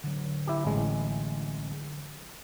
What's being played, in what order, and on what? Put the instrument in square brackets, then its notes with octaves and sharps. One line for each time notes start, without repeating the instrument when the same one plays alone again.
[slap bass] D3 F#3
[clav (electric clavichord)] E4 G4
A1 G#3